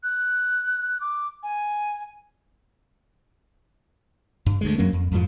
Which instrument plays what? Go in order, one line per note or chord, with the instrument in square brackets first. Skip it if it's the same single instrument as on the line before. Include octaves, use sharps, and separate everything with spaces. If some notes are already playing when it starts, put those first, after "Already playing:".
[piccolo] F#6
D6
G#5
[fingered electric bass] G2
D2 F3 G#3
F#2 F#3 A#3 C#4
F2
F2 G#2 F3